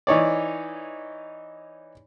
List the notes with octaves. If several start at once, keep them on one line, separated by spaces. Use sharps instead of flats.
E3 D#4 C#5 D5